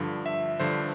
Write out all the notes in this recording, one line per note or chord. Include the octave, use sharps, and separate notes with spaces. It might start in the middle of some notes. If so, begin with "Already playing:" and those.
Already playing: G2 D3 F3
E5
G2 D3 F3 C5